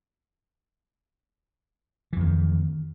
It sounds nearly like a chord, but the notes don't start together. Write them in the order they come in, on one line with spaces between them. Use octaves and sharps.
E3 F2 D#3